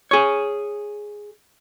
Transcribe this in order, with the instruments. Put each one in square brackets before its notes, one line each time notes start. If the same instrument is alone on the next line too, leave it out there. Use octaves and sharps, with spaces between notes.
[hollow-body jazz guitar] G#4 C#5